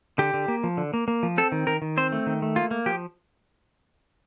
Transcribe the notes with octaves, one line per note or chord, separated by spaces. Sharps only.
D3 G4
D3
A#3
F3
D3
A#3
A#3
F3
C4 A4
D#3
D#3 A#4
D#3
C4 C5
A3
D#3
A3
A#3 F4
A#3
F3 G4